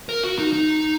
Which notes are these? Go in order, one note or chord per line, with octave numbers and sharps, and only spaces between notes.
A#4
F#4
D#4
D#4